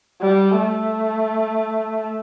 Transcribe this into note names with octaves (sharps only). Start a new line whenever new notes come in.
G3
A3